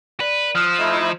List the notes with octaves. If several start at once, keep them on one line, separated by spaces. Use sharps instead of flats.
B4 D5
F3 D#6 F6 F#6
A3 D#4 E4